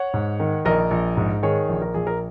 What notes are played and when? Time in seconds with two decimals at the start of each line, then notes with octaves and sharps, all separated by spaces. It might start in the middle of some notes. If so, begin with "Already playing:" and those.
Already playing: C#5 F#5
0.14 G#2
0.40 D#3
0.65 A#1 A#4 D#5
0.91 A#1
1.17 G#2
1.43 D#3 G#4 C#5
1.69 A#1
1.82 A#4
1.94 A#1 G#4
2.07 A#4